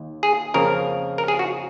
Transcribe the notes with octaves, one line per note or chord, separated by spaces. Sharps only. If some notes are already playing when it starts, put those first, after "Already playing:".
Already playing: D#2
G#4
F2 C#3 F3 A#3 A#4
A#4
G#4
F#4